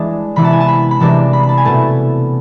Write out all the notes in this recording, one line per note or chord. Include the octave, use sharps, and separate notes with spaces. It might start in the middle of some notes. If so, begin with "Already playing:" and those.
Already playing: E3 G#3 D4 A5
C3 E3 B3 E4 B5
A5
G#5
A5
B5
B5
C3 E3 G#3 D4 A5
B5
B5
A5
G#5
B2 A3 E4 A5